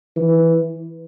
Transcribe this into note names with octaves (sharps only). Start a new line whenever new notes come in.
E3